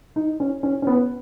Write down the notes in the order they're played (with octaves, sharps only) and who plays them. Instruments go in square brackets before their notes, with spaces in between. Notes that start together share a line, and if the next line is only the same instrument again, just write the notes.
[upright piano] D#4
C#4
C#4
C#4
B3